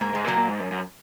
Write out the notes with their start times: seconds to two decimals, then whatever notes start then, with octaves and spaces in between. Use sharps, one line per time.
0.01 G#2 A#3
0.13 G#2 G#3
0.24 A#2 F#3 A#3
0.37 A#2
0.48 G#2
0.60 F#2
0.72 F#2